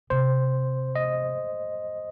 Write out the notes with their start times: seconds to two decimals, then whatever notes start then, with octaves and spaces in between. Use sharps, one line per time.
0.10 C3 C5
0.96 D#5